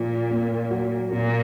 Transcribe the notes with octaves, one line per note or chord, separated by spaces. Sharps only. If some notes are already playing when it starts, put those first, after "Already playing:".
Already playing: A#2 F3
A#3
F#3
A#2 A#3